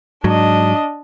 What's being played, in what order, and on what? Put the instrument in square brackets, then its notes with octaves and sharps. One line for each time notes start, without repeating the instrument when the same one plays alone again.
[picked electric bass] G#2 F#3 [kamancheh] D4 D#5